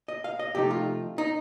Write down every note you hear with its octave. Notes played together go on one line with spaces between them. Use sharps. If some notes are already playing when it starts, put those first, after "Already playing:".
D#5
F5
D#5
C3 F3 A3 D#4 G4
F4
D#4